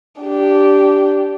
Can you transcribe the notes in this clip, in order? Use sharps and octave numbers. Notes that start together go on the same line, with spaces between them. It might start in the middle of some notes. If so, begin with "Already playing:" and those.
D4 G4